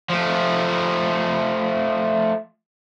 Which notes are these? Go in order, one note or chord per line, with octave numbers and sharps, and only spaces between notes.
F3 A3